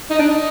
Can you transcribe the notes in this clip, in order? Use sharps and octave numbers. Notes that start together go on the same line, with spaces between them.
D#4
D4
D#4